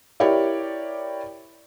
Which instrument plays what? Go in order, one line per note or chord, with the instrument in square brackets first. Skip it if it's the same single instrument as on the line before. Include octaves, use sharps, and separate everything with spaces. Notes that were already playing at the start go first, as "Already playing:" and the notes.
[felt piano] E4 G4 A#4 C#5 D5